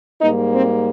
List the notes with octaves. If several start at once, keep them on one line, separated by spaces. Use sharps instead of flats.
G#2 G3 A#3 D#4
C4